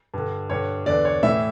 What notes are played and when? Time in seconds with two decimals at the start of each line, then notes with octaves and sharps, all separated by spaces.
0.14 G2 D3
0.50 G2 D3 C#5
0.86 E2 D3 D5
1.05 C#5
1.23 A2 E3 E5